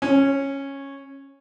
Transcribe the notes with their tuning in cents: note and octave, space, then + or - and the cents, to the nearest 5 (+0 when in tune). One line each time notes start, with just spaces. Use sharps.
C#4 -10